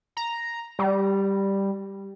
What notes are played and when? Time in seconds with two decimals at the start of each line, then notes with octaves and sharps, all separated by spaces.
0.17 A#5
0.79 G3